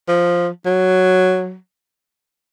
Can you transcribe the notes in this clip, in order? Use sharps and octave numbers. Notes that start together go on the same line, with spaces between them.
F3
F#3